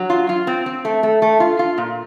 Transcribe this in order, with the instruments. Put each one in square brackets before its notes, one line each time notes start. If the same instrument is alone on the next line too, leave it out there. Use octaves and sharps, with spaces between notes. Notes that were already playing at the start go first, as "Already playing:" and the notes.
Already playing: [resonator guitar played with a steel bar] F#3
F4
F4
C4
C4
A3
A3
A3
F4
F4
A#2